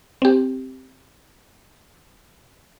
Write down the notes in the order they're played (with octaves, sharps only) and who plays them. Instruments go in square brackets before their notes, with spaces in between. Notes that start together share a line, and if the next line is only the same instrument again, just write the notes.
[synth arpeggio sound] C4 G4